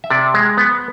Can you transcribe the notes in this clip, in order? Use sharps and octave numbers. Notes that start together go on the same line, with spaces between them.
E5
C3 D5
G#3
B3